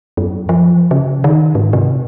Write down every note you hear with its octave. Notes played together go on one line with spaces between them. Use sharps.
F#2
F3
C#3
D#3
G#2
C3